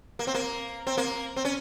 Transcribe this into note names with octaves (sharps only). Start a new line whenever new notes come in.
A#3
C4
A#3
C4
A#3
C4
C#4